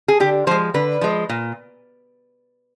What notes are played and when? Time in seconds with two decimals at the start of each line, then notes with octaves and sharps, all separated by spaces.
0.08 G#4
0.20 D3 G4
0.47 F3 C5
0.51 G#3
0.74 D3 B4
1.01 F3 G#3
1.29 A#2